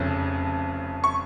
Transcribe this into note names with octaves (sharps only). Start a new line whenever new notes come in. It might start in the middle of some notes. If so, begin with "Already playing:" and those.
Already playing: F1 F2 C#3
C#6